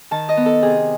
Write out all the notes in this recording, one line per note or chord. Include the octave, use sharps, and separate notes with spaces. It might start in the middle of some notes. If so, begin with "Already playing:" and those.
D#3 A5
D#5
B3
A4
C3 G#4